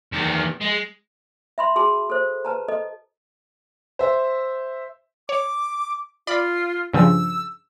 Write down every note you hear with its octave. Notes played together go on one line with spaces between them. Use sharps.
E2 D#3
G#3
E5 B5 C6
F#4 G#4 A5 C6
A4 C5
B4 A5 A#5
A4 D#5
C5 E5
C#5 D6
F4 D5 B5
G2 C#3 F3 E6